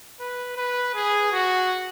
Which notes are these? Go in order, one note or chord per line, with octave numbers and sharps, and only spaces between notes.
B4
B4
G#4
F#4